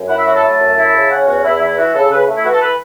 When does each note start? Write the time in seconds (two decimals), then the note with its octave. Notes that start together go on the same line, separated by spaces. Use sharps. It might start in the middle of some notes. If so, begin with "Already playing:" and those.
Already playing: F#2
0.09 E4 F#5
0.17 E5
0.26 F#3 F#4
0.34 A4
0.43 A3 A5
0.59 F#2
0.77 E4
0.93 C#3
1.10 C#4 F#5
1.27 E2 F#4
1.44 E2 E4
1.61 E3 E4
1.77 E4 F#4
1.94 C#3 A4
2.11 C#3 B4
2.28 A3
2.36 E4
2.45 E3 F#4
2.53 A4
2.61 B4